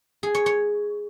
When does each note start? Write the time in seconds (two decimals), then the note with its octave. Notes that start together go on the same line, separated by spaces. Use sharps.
0.23 G#4
0.35 C#5
0.46 C#5